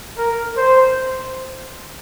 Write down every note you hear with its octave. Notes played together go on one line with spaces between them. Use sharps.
A#4
C5